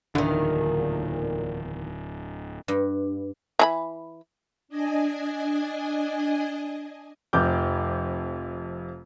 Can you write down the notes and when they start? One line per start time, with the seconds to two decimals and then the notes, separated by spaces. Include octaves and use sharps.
0.15 D1 G1 E2 A#2 D3 D#3
2.68 G2
3.59 E3 G#4 B5
4.69 D4 D#5 G#5
7.33 F1 F2 D6 G6